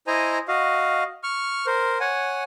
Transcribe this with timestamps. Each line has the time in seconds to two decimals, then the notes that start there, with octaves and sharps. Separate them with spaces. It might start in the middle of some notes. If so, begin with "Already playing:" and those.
0.07 E4 C5 D#5 G#5 A#5
0.48 F#4 D#5 F5
1.23 C#6 F6
1.66 A#4 C5
2.00 C#5 F#5 G#5